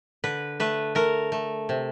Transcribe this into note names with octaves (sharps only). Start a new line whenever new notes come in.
D3 B4
A3 B4
A3 A#4
A3
C3